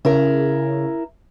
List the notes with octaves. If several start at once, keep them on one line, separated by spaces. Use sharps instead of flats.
C#3 E4 A#4